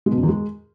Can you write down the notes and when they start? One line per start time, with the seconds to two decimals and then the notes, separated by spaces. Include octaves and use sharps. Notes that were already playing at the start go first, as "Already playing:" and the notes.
0.06 G#3
0.12 B2
0.17 F#2
0.23 E2
0.28 G#3